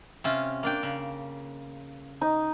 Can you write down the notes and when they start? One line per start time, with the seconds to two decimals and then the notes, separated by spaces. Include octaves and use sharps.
0.24 C3 C#4 F4
0.63 A#3 D4 G5
0.83 C#3
2.21 D#4